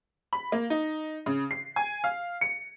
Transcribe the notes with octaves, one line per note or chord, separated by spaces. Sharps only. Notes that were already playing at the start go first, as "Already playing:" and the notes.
B5
A#3
D#4
C#3
C7
G#5
F5
C#7